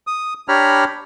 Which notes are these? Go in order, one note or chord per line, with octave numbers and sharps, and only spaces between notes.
D#6
D4 G4 C#5 A#5 B5 F6